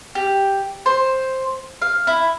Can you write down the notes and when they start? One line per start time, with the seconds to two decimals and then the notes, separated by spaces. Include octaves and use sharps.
0.15 G4
0.86 C5
1.82 F5
2.07 E4